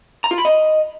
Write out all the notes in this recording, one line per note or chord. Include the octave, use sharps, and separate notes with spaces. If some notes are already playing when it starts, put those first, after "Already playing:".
A#5
F4
B5
D#5